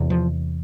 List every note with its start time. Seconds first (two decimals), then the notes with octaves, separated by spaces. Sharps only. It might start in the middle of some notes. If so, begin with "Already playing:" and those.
Already playing: E2 C3
0.10 F3